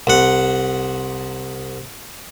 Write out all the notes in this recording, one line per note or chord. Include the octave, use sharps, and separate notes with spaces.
C2 F#5